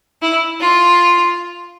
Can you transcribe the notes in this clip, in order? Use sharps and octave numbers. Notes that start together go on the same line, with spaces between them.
E4
F4